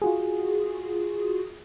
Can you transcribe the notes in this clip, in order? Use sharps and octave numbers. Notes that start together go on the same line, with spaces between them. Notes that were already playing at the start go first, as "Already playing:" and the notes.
F4 F#4 G#4